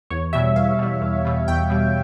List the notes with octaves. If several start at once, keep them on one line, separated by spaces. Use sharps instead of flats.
E2 C#5
B2 G3 E5
E2 F5
B2 G3
E2
B2 G3
E2 G5
B2 G3